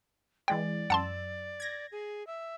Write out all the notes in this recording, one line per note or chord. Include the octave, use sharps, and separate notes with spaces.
E3 G#3 G#4 D5 G5
F#2 F#5 A5 C6 E6 A6
G#6 A#6
G#4
E5